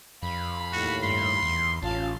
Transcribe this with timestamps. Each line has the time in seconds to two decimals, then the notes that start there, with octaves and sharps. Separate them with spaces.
0.23 F2 F5 B5
0.73 D#2 A2 F#4
1.03 G2 C6
1.43 E2
1.83 A1 C#4 F4 F5 A5